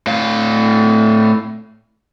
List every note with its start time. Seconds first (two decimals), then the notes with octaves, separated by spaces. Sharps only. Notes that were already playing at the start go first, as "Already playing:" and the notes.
0.07 A2 F5